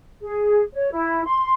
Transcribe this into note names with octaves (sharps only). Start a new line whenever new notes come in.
G#4
C#5
E4
C6